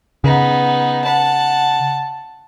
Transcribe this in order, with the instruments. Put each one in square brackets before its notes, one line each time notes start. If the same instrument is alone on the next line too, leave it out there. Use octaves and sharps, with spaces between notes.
[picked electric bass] C#3 [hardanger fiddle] B3 D#4
[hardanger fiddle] F#5 A5